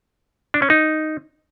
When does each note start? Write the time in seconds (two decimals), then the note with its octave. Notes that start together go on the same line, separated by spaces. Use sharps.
0.54 D4
0.62 C#4
0.70 D#4